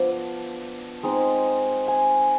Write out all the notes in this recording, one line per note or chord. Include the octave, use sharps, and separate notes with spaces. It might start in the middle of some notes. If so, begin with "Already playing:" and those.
Already playing: F3 B3 D4
G#3 C4 D#4
G#5